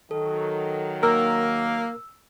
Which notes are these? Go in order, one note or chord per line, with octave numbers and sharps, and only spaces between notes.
D#3 F#3 A4
A#3 A#4 E6